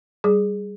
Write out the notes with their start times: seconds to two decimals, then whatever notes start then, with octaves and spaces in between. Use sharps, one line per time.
0.24 G3 G#4